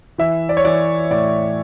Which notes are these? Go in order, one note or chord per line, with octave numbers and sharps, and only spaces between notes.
E3 E5
D5
C#5
E3 D5
A2 D5